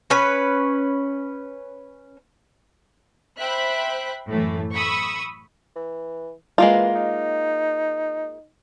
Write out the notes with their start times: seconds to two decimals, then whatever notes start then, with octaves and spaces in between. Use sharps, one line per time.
0.10 C#4 B4
3.38 C5 E5 G5 B5 F#6
4.30 F#2 A2 E3 A3
4.75 B5 C#6 D#6 E6
5.76 E3
6.58 E3 G#3 A#3 F4
6.96 D#4